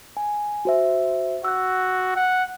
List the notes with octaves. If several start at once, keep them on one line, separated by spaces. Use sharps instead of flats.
G#5
F#4 C5 E5
F#4 E6 F#6
F#5